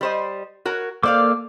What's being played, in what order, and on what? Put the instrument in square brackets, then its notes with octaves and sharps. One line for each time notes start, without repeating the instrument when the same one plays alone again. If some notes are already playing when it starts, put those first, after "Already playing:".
[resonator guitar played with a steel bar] G3 C5 D#5
F#4 A#4 C#5
[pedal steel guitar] A#3 A4 D6 [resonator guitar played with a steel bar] C5 D5 F5